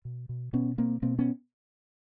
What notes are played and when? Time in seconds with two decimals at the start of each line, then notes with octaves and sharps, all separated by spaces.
0.05 B2
0.29 B2
0.53 B2 B3 C#4
0.78 B2 A#3 C4
1.02 B2 A#3 C4
1.19 B3 C#4